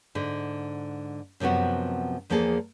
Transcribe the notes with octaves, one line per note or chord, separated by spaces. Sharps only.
G#2 D3
F#2 C3 F3 B3 F#4
E2 F3 A#3 G#4 A4